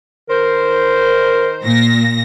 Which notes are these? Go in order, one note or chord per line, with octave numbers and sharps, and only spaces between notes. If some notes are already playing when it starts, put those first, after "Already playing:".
D#3 A#4 C5
A#2 A#6